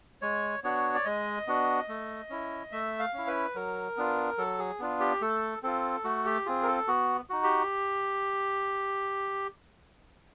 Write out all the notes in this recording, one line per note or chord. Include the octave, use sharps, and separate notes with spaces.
G#3 C#5
B3 D4 F#4 C#5
D5
G#3 D#5
B3 D4 F#4
A3
C#4 E4
A3 E5
F5
C#4 E4
B4
F#3 A#4
B3 D4 F4
F#3 A4
G#4
B3 D4 F4
G4
A3 A4
C4 F4 A4
A3 F#4
G4
C4 F4 G#4
A#4
A4
B3 F#4
D#4 F#4
G4